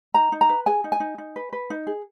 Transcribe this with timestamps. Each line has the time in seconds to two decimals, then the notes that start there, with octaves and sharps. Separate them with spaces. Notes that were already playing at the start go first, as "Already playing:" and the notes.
0.14 D#4 A#5
0.32 D#4
0.41 A#5
0.49 B4
0.66 G#4 G#5
0.84 D#4
0.92 G#5
1.00 D#4
1.18 D#4
1.36 B4
1.53 B4
1.70 D#4
1.87 G#4